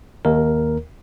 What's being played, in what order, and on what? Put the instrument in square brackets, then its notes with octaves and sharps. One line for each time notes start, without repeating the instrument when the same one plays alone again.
[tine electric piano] D#2 A#4